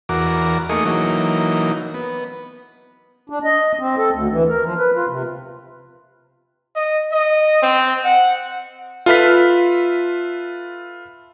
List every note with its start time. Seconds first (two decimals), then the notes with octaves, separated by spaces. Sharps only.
0.09 E2 F#4 A#4 D6
0.69 A3 A#3 D#4 G#4 C#6 D#6
0.85 E3 F#3 A#3 D#4
1.94 B3
3.30 D4
3.44 D#5
3.79 C4
3.98 A4
4.11 D2
4.32 E3
4.49 A#4
4.64 F3
4.78 B4
4.95 F4
5.09 C3
6.75 D#5
7.12 D#5
7.63 C4
8.04 F#5
9.06 F4 A4 B4 E5 F6 B6